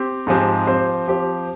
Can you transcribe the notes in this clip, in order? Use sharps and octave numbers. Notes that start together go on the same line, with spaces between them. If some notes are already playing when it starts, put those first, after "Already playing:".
Already playing: C4 G4
G#2 F3 G#3 C4 G4
F3 C4 G4 C5
F3 C4 G4 C5